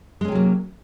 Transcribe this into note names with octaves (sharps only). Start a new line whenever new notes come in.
C3 F#3 G#3 A#3 C#4